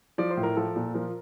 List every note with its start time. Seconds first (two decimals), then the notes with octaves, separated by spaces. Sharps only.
0.18 F3 D5
0.30 C5
0.37 A2
0.43 A#4
0.56 F3 A4
0.76 A#2
0.94 F3 A#4